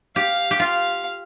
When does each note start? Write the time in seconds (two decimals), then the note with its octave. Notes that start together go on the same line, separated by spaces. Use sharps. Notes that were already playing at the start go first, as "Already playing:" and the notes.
0.16 G4 F5
0.51 G4
0.59 F4 F5